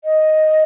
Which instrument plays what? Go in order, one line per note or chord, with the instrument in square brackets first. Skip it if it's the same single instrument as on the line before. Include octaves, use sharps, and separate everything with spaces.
[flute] D#5